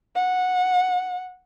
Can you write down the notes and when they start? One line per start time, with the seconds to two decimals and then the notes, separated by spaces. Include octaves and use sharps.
0.16 F#5